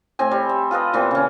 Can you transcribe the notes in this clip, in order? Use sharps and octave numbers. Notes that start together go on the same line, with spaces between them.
A2 C4 G#5
G3
E5
F4 A4 B4 D#5
A#2 E3 B3 C4
C#3 C#4